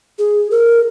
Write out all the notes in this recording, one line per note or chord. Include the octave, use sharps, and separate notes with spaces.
G#4
A#4